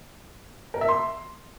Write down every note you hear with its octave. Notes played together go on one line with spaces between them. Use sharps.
A#4
E5
C6